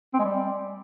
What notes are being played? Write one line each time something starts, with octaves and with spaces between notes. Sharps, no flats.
C4
G#3
G3